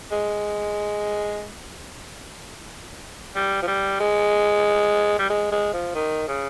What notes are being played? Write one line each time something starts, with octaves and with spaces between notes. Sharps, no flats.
G#3
G3
F3
G3
G#3
G3
G#3
G#3
F3
D#3
C#3